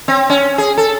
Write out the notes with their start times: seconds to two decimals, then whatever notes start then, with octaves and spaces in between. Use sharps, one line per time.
0.08 C4
0.30 C#4
0.58 G#4
0.78 A4